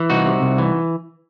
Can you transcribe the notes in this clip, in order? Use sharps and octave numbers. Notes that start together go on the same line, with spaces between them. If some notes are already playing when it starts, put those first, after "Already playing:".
Already playing: E3
C2 D#4 F#4
C3
C2
E3